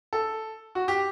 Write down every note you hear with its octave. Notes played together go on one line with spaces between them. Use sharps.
A4
F#4
G4